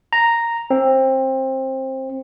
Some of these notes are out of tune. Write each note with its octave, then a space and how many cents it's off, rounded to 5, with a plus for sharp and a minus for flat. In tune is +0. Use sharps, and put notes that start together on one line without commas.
A#5 -5
C4 +20